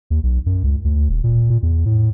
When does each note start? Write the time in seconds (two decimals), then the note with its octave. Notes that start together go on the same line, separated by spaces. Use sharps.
0.10 D#2
0.23 B1
0.46 F#2
0.64 C#2
0.84 D2
1.09 D#1
1.24 A#2
1.50 A#2
1.63 E2
1.86 A2